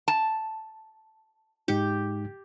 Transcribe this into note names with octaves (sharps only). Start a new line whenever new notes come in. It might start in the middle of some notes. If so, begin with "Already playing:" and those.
A5
G#2 G#3 D#4 G4